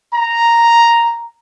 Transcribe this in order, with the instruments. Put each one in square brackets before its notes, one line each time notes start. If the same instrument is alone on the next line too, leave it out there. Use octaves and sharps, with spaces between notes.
[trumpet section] A#5